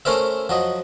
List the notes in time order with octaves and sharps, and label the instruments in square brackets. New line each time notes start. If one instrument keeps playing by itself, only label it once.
[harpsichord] A3 C#4 A#4 C5 E5
F3 F#3 D#5